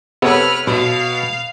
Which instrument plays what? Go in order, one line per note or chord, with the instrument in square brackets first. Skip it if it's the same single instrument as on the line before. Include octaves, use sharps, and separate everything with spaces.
[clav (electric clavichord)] C3 B3 [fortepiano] A4 C#5 E6 [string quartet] B4 F6
[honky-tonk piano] B2 [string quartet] F5